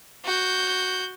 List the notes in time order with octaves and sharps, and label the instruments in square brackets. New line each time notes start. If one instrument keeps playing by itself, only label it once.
[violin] F#4 G6